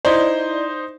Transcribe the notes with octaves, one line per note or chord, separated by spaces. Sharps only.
D#4 E4 C5 D5